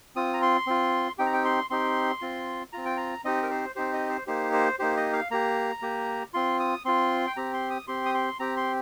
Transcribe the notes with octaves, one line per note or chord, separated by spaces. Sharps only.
C4 F4 D#6
A#5
C6
C4 F4
C4 D#4 G4 G5
A#5
G5
C6
C4 D#4 G4 C6
C4 F4
C4 F4 A#5
G5
A#5
C4 D#4 G4 D#5
A#4
C5
C4 D#4 G4 C5
D#5
C5
A#3 D#4 G4 C5
C5
A#3 D#4 G4 C5
D#5
F5
A#3 G4 A#5
A#3 G4
C4 F4 C6
D#6
C4 F4 C6
G5
C4 G4 A#5
C6
D#6
C4 G4 C6
D#6
C6
C4 G4 A#5
C6